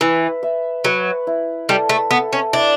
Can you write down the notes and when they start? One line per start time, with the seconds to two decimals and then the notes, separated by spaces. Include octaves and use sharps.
0.01 E3 B4
0.43 E5
0.84 F#3 B4
1.27 E4
1.69 G3 A4
1.89 A3
2.11 B3 A4
2.33 C#4
2.53 D4 E4